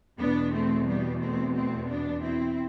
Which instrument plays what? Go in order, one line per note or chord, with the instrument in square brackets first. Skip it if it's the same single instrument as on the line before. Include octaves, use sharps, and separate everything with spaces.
[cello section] E2 B2 B3 D4
A3 C4
G3 B3
A3 C4
A3 C4
B3 D4
C4 E4